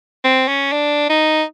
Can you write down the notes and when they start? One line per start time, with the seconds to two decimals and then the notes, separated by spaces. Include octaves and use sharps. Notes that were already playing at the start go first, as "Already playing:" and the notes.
0.24 C4
0.48 C#4
0.73 D4
1.10 D#4